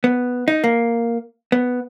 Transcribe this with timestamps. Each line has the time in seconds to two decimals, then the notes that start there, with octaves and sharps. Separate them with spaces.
0.04 B3
0.48 D#4
0.64 A#3
1.52 B3